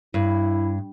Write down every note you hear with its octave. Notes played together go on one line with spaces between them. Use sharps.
G2 E4